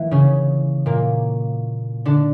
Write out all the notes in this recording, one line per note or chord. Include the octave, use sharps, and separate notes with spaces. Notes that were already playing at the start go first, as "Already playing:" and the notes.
Already playing: E3 A#3 E4
C#3 C#4
A#2 A#3
D3 D4